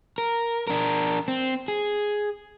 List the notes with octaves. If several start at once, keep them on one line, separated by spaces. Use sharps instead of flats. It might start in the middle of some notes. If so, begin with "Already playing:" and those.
A#4
D4 A#4
C4
G#4